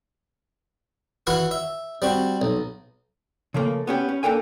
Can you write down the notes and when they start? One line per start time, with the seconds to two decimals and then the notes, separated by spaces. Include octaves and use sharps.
1.27 E3 E4 F#4 B4 F5 F#5
1.51 E5
2.02 G3 C4 F#4
2.42 B1
3.54 C#3 F3 A3 A#3
3.87 B3 C#4 G4
4.09 C#4
4.23 A#3 D4 A4 A#4 G5 G#5